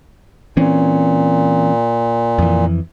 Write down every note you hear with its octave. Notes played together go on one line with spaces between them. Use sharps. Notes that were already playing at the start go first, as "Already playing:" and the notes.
A#2 E3 C4 C#4
F2 E3